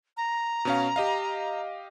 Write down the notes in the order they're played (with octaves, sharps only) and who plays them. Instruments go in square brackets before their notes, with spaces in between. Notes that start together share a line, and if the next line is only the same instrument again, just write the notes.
[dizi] A#5
[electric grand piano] B2 C#4 F5
G4 D#5 F5